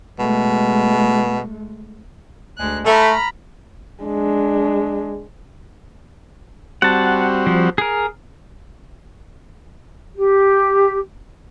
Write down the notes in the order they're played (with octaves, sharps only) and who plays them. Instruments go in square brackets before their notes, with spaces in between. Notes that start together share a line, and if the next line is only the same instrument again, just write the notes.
[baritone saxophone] B2 [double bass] G#3 A3
[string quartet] D2 G#3 F#6
[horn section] A3 [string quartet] A#5 B5 F6
[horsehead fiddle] G#3 D4
[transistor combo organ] G3 C4 F#4 [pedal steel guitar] F#5 A5
[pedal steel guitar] F3
G#4 A#4
[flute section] G4